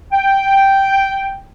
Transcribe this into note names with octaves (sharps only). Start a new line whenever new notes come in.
G5